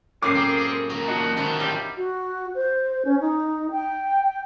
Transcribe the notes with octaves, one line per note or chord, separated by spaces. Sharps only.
F#2 A2 F3 A#3 C#4 G#4 D6 C7
C4
A#2 F#3 A#4
D4 D#4 F#4
D3 D#3 C4 E4 F4
F#3 G3
F#4
C5
C#4
D#4
G5